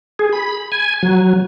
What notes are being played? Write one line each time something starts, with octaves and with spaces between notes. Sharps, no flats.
G#4
B5
G#5
F#3